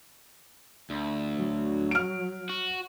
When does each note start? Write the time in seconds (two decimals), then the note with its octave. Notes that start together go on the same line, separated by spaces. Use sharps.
0.90 D2
1.38 F#3
1.91 F6 D7
2.49 F#4